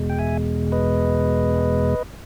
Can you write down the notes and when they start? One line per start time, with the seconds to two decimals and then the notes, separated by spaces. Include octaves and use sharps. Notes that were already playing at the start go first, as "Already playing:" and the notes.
Already playing: E2 B2 G#3
0.10 G5
0.19 E5 G#5
0.72 B4 D#5